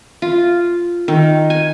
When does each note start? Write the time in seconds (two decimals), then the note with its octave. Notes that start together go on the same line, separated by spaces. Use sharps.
0.22 F4
1.08 D#3
1.50 G#5